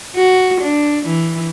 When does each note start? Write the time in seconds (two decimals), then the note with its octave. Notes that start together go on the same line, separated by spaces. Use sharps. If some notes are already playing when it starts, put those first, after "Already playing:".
0.15 F#4
0.61 D4
1.06 E3